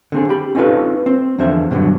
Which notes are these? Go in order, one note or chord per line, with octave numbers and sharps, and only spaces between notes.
D3 C4 G#4
G4 B5
C4 C#4 D#4 F4 A4 B4
C4
E2 D3 F3 C5 E5
G2 B2 D3 E3 F#3